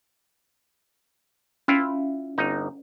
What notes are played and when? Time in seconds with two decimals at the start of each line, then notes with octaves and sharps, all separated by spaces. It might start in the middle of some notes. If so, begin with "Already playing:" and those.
1.68 C#4 E4 F4 E5
2.38 G1 D#4